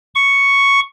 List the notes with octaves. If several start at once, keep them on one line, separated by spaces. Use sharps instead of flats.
C#6